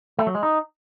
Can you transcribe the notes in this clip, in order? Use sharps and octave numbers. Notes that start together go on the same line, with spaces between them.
A3
F#3
G#3
D#4